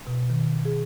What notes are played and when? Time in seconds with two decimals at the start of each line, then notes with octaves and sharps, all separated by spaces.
0.07 B2
0.30 D#3
0.65 G#4